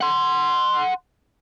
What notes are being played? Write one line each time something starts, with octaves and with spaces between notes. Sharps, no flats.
F#5 C6